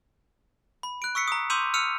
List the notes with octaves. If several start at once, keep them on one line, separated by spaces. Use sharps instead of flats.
B5
F#6 D7
C#6 E6 B6 C#7
A#5 D#6
C6 D6 E6 G6 D#7 F7
E6 F6 C#7 D#7 F7